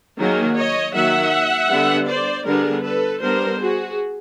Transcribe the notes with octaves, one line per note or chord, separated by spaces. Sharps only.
D#3 F#3 A#3 G#4 A#4
C#5 D#5
D#3 F#3 A#3 E5 F#5
D3 G3 B3 D4
C5 D5
D3 G3 B3 D4 G#4 A#4
A4 B4
G3 B3 D4 A#4 C5
F#4 G#4